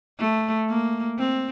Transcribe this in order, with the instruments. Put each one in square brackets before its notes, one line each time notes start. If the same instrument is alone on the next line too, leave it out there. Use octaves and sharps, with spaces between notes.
[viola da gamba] A3
A#3
C4